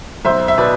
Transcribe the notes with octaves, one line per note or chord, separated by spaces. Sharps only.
B1 C5 E5
E5
B2 B4 D5